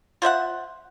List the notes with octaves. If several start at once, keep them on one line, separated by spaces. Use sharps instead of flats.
F4 C5 E5 F#5